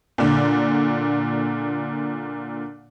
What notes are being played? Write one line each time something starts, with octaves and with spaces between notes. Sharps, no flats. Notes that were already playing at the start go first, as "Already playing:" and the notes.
A#2 D3